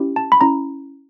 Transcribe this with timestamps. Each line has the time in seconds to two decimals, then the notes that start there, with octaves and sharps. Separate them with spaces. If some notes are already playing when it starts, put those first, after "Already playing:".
Already playing: C#4 E4 G4
0.16 A5
0.32 B5
0.41 C#4 E4 A#5